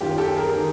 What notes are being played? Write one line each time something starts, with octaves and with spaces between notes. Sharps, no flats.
F#2 D#3 F4 G4
G4 A4
G#4 A#4
D#3